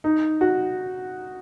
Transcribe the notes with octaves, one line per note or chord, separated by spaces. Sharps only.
D#4
F#4